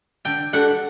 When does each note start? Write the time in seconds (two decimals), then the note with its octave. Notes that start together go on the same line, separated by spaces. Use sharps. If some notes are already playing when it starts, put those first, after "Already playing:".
0.25 D3 G5
0.53 G3 D4 F#4 A4 F#5